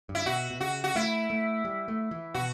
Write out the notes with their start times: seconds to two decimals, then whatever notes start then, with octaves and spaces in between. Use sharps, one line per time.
0.09 G2
0.15 E4
0.26 B2 F#4
0.50 B2
0.61 C#3 F#4
0.84 F#4
0.95 A3 E4
1.30 A3
1.65 G3
1.88 A3
2.11 E3
2.34 B2 F#4